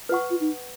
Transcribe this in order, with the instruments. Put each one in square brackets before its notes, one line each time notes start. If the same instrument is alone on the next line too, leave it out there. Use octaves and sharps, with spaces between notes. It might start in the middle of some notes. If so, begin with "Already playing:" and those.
[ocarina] F4 [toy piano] B4 F#5 C#6
[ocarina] F4
D#4